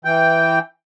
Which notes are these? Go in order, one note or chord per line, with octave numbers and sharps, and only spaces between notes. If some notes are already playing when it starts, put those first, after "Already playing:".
E3 G5